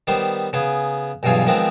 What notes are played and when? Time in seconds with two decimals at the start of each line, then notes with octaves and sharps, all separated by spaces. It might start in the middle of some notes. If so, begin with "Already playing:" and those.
0.07 D#3 G3 B3 C5
0.53 C#3 B3 G#4
1.23 B1 G2 B2 E3 F4 G#4
1.47 D#3 F3 G#3 B3 C4